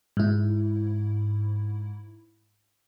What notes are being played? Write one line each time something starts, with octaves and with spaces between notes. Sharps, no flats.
G#2 E4